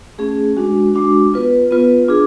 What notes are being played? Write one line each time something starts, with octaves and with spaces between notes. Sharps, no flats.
A3 C#4 G#4
G#3 D4 F#4
G#3 D4 F#4
B3 F4 B4
B3 F4 B4
D4 F4 G#4